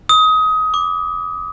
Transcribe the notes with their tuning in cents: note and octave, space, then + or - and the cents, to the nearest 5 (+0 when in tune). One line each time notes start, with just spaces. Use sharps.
D#6 +20
D6 -5